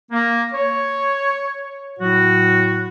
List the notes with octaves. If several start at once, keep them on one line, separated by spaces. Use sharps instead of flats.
A#3
C#5
A2 F#3 F#4